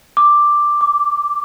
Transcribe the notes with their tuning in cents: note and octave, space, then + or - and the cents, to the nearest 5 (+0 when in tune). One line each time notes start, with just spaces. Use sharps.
D6 +5
D6 -20